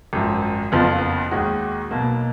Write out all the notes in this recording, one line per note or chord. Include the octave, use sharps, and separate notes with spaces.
G#1 F#2 F3
F#1 F2 F3 B3 F4
D#2 D#3 G#3 D#4 F#4
B1 B2 F#3 A#3